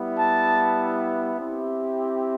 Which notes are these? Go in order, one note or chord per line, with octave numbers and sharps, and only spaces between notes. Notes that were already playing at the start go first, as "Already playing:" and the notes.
Already playing: G3 B3 E4
A5
C4 E4 G4